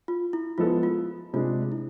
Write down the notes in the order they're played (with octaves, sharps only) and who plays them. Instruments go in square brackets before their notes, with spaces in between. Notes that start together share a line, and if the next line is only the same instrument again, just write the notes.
[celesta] F4
E4
[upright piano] F3 G#3 B3 E4 A4 [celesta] F4
[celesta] F4
[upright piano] C3 G#3 D4 [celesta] F4
[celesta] E4